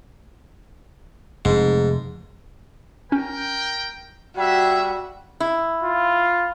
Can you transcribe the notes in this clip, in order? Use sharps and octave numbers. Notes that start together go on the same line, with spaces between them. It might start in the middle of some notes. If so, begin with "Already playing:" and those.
F1 G#2
C#4 A#4 G5
G3 F#4 G#4 E5
E4
F4